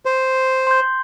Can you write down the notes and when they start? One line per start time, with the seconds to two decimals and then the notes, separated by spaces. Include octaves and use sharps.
0.06 C5
0.67 C6 G6